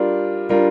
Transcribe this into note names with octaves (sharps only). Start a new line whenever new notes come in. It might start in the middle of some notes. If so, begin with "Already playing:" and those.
Already playing: G3 D4 F4 A#4
G3 D4 F4 A#4